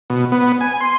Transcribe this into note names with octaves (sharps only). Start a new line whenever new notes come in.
B2
B3
G#5
C6